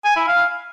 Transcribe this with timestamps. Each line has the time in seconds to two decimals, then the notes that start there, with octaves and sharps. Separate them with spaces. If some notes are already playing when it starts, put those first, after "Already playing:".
0.04 G#5
0.16 E4
0.28 F5